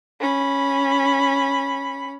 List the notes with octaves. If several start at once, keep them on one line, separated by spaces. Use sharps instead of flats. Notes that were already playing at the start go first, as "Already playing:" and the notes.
C#4 B5